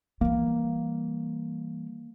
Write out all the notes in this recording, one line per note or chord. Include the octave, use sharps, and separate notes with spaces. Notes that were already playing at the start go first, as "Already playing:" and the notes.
E3 G3 A#3